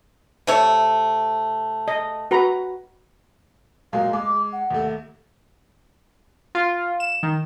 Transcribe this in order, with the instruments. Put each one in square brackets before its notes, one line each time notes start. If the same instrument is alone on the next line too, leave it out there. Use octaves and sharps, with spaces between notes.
[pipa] C3 A3 C#5
[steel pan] D#5
F#4 B4 A#5
[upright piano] A#2 F#3 G#3 [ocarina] F5
[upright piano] G#3 [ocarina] D6
[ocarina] F#5
[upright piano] D#2 A3
[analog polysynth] F4
E7
D#3